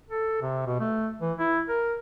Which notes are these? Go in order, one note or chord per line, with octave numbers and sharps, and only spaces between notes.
A4
C3
B2
A3
E3
E4
A#4